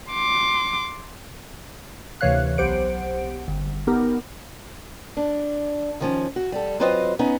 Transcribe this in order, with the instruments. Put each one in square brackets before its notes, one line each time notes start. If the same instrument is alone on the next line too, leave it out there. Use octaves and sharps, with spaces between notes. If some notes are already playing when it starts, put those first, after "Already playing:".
[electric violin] C6 D6
[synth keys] D2 C3 E3 C#5 F5 F#6
B1 G4 C5 F#5 D7
G1
B3 D#4 G4 A#4
[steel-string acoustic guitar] D4
D#3 F3 C#4
F#4
G3 A4
F#3 C4 F4 B4 C5 D#5
B3 C#4 D#4